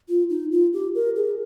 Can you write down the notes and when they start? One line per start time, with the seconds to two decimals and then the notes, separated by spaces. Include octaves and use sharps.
0.09 F4
0.30 D#4
0.52 F4
0.73 G4
0.95 A#4
1.16 G#4